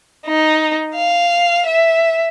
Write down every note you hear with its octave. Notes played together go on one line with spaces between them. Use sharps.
D#4
F5
E5